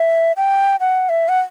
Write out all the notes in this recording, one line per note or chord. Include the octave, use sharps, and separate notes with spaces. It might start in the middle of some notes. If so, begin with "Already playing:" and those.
Already playing: E5
G5
F#5
E5
F#5